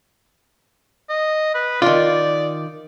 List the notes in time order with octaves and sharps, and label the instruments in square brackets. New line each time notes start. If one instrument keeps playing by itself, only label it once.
[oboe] D#5
B4
[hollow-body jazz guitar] D#3 F4 [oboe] D5